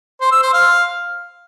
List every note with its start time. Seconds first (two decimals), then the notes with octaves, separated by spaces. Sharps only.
0.21 C5
0.32 E6
0.43 C5
0.53 F5